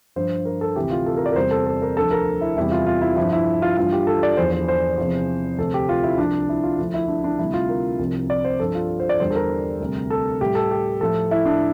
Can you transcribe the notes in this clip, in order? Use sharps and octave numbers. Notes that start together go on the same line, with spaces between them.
G2 F3 C5
A#4
A4
D2 C3 E3 G4
F4
A4
A#4
D5
A#4
E2 C3 G3 C5
A4
A4
A#4
D2 D3 F3 A4
A#4
E4
E2 C3 E3 G3 E4
F4
F4
E4
G2 F3 E4
E4
F4
G2 E3 G3 F4
G4
A4
D5
E2 D3 F3 C5
C5
C5
E2 C3 F3
D2 C3 F3 A4
G4
F4
E4
C2 C3 F3 D4
E4
F4
D2 D3 F3 E4
E4
D4
D4
D2 C3 G3 E4
F4
A#4
C2 C3 F3
D5
C5
G2 F3 A4
F4
C5
D5
E2 D3 G3 C5
A4
A#4
D2 C3 G3
A4
A2 G3 G4
A4
G4
A2 F3 A4
E4
D4